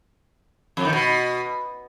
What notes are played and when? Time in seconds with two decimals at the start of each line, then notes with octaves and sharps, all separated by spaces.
0.77 F2
0.85 D#3
0.93 B2